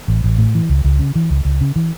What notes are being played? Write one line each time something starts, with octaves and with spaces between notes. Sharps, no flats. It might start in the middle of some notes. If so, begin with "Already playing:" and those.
A1
A1
A2
E3
C#2
C#2
C#3
E3
C#2
C#2
C#3
E3